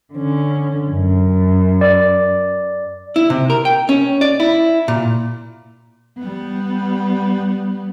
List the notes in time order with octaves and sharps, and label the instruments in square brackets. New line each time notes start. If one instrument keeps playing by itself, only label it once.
[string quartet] D3 C#4
F#2
[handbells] D5
[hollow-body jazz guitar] E4
C3
A#4
G5
C#4
D5
E4
A#2
[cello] G3 B3